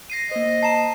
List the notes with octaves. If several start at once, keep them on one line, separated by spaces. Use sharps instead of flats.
A#6 C7 D#7
A#3 C5 D#5
A5 A#5 C7 E7